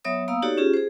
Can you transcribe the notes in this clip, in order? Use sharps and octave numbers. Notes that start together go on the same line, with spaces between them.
F#3 B3 C#5 E5 D#6
A#3 B3 F5 A#5 D#6 E6
D#4 F#4 G4 A4 C#5 D5
C#4 F4 G4 G#4
G#4 C5